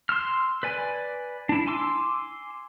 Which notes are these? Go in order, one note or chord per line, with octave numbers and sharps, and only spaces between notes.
C6 E6 F6
B4 D5 G#5
D4 E4
G#5 C6 D6 E6